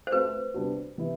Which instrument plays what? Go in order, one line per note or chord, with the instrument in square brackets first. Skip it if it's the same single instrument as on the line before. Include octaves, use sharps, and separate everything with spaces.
[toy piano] C5
[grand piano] A3 C4 F#4 [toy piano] B4
[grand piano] C3 G3 B3 D4 F#4
C3 E3 B3 E4